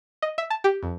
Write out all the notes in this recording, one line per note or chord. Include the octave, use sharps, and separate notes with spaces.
D#5
E5
A5
G4
F2